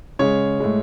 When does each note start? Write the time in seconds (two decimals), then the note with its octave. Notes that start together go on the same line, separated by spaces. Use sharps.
0.19 C#3 G#3 C#5
0.60 A2 G#3